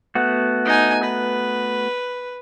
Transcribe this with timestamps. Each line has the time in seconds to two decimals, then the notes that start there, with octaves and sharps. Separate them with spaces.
0.15 A3 B3 F#4
0.65 D#4 G#5
1.03 B4